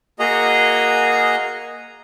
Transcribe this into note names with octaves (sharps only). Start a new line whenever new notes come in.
A#3 F#4 G#4 D#5 A#5